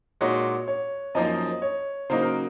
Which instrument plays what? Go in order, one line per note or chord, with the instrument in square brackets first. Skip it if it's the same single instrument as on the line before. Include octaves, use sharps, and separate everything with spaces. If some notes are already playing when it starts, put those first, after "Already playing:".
[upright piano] A#2 G#3 D#4 F#4 [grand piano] C#5
[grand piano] C#5
[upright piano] F#2 F3 A#3 D#4 [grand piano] D#5
[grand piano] C#5
[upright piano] C#3 F#3 A#3 D#4 [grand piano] C5
[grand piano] A#4